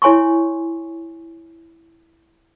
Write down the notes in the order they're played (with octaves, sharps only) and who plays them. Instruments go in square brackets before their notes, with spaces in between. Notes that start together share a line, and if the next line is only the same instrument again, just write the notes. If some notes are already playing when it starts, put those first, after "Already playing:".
[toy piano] E4 C#5 G#5 C6 C#6